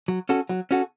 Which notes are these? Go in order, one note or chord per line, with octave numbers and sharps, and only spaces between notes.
F#3
C#4 F#4 A4
F#3
C#4 F#4 A4